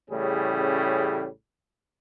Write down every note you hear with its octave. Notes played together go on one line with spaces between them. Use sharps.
A1 A2 C#3 G3 C#4 G#4